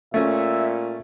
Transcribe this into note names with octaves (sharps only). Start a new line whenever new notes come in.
A#2 A3 C#4 E5